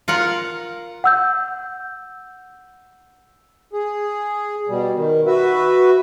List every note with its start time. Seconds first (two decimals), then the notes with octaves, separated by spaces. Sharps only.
0.08 F4 A#4 F#5
1.04 F#5 E6 G6
3.73 G#4
4.68 B2 G3
4.96 D#3
5.27 F#4 B4 E5